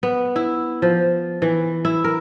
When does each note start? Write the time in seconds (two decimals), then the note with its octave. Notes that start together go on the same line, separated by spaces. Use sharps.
0.03 B3
0.36 E4
0.82 F3
1.42 E3
1.85 E4
2.04 A#4